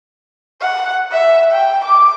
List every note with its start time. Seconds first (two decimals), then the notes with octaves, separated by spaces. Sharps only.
0.61 F#5
1.11 E5
1.51 G5
1.85 D6